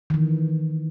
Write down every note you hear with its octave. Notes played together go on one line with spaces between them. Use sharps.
D#3 E3